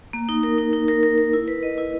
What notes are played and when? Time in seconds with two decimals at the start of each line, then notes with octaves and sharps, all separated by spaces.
0.13 A#3
0.29 D#4
0.43 A#4
0.58 D#4
0.73 D#4
0.88 A#4
1.03 A#4
1.18 A#4
1.33 E4
1.48 B4
1.63 D#5
1.78 E4